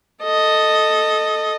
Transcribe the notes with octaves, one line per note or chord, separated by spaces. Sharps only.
A4 D#5